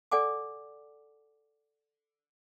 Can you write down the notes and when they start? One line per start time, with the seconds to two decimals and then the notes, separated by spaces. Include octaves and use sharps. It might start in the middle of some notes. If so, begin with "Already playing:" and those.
0.12 A4 D5 F#5 G#5 D6